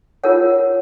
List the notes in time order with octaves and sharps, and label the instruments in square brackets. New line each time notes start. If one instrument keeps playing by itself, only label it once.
[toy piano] F4 A#4 C#5 F#5